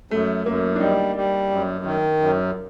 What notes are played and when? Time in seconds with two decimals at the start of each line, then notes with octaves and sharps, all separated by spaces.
0.11 F#2 A3
0.46 F#2 A#3
0.76 D4
0.80 G3 D#4
1.16 G3
1.50 F#2
1.85 D#3
2.20 F#2